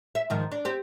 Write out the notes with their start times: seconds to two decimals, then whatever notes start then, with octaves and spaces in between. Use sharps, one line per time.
0.15 E5
0.30 G#2 D#3 F3
0.52 D4
0.65 C4 G4